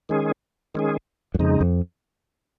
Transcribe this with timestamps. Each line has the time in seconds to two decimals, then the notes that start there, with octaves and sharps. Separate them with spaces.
0.09 D#3 G#3 C#4 G#4
0.75 D#3 G#3 C#4 G#4
1.34 F#2
1.39 F2 C#3 G#3 D#4
1.61 F2